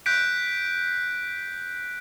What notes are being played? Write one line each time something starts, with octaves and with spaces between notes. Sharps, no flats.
F#6 G6 B6 D7